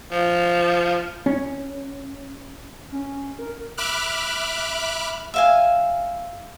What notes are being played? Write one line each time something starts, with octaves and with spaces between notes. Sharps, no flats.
F3
C#4
C#4
A#4
E5 B5 D6 F6 F#6
E5 F5 G#5